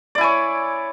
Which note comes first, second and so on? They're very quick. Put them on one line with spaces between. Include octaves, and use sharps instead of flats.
D5 E4 G#5 C#5